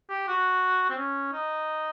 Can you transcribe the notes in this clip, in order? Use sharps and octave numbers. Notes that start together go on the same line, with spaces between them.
G4
F#4
C4
C#4
D#4